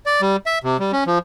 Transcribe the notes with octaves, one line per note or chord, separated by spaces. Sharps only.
D5
G3
E5
C3
G3
C#4
F3